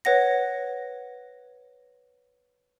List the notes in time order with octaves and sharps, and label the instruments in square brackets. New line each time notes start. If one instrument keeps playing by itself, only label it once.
[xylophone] B4 C#5 F#5 A#6